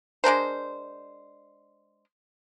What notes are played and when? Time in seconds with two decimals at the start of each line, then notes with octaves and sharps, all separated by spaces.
0.24 G#3 D4 A#4 C5